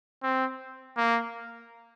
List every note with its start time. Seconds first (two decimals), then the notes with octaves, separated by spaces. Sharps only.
0.23 C4
0.97 A#3